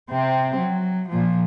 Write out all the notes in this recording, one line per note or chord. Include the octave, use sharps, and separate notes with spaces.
C3 C4
F#3
A#2 F3